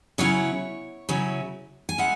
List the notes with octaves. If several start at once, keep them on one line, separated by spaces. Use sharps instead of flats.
C#3 F#3 C#4 E4 C#5
C#3 F#3 C#4 E4
G#5
G#3 C#4 E4 F#5